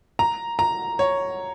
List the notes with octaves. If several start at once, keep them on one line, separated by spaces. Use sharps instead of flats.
A#5
A#5
C#5